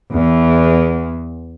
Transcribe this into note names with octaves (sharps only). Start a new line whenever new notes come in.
E2